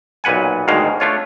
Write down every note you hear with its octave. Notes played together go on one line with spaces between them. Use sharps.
B1 A#2 B4 F#5 G#5
D2 G#2 B2 D#3 G#3 F5
A3 D4 F4 C#5